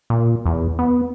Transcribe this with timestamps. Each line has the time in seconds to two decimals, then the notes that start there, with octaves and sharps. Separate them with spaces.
0.10 A#2
0.46 E2
0.79 B3